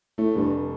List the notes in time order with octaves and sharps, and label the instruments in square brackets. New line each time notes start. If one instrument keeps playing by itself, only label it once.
[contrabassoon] A2 [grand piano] A3
[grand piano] F1 [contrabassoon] G2